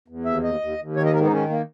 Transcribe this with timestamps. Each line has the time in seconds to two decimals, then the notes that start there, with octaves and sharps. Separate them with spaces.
0.08 E2
0.25 D#2 E5
0.43 D#2 D#5
0.60 D#2
0.78 D#2
0.96 D#3 C#5
1.05 D#5
1.13 G#2 A#4
1.22 B3
1.27 D#4
1.31 D#3 C#4
1.49 A#3